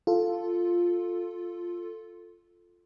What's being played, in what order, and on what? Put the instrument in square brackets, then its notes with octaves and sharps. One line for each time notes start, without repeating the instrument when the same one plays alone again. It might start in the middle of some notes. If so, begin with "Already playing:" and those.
[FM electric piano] F4 A4